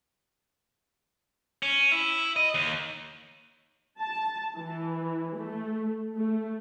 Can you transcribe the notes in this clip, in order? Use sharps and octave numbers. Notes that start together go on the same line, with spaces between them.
C#4
E4
D#5
D#2
A5
E3
A3
A3